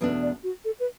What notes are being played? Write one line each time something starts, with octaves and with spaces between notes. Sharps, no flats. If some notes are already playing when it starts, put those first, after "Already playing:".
E2 B2 A3 D4 B4
D5
F#4
A4
B4